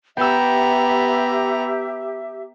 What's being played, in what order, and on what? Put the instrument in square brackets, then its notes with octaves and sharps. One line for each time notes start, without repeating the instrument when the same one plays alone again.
[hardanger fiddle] B3 A#5 [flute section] G4 E5 [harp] G5 E6